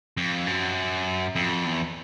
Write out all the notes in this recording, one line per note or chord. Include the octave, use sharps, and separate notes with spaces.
F2
F#2
F2
E2